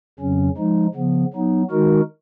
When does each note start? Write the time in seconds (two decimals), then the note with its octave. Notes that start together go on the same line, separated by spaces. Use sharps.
0.19 F2 C#3 F#3 C#4
0.57 F3 G#3 D#4
0.94 C#3 F3 B3
1.33 F#3 B3 D#4
1.71 D#3 G#3 D#4 F#4 A#4